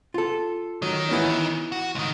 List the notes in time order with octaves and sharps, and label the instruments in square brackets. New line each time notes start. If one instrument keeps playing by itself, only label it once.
[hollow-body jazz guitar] F4 A4
[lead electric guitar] D#3 [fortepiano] F#3
[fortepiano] E3 B3 C#4
[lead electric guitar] F#4
C#2 D#3